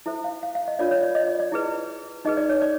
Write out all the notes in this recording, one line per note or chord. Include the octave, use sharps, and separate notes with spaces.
E4 A4 C5 E5
F5
F5
F5
D#5
D4 F4 A#4 C#5 D5
C#5
D5
D#5
D5
D5
E4 G#4 B4
D#4 G#4 B4 D#5
D5
C#5
D5